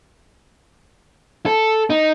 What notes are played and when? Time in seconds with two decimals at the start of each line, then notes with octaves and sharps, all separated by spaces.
1.46 A4
1.90 D#4